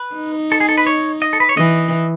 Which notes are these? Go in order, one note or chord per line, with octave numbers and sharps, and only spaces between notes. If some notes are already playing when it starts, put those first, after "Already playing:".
Already playing: B4
D#4
A4
G#4
A4
B4
C#5
D#5
A4
B4
C#5
E3 D#5